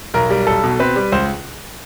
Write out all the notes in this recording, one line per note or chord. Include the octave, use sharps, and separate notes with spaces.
B1 A#4
G3
B1 A4
B2
C4 B4
G3
C#2 C5